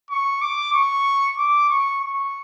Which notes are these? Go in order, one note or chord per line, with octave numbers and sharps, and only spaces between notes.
C#6
D6
C#6
D6
C#6
C#6